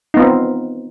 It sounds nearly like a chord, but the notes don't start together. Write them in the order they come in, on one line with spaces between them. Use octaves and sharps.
D#4 B3 F4 C4